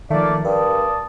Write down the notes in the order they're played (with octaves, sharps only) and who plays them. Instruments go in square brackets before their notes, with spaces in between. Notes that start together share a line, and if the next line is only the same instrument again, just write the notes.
[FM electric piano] D#3 F3 [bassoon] A3 [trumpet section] A#3 D5
[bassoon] G2 [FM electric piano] A#4 [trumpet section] D5 A5 D#6